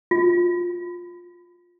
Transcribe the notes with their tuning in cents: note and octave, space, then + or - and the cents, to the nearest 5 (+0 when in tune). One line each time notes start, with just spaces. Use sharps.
F4 +10